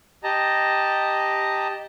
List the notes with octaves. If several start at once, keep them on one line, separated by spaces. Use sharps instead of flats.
G4 D#5 A5 A#5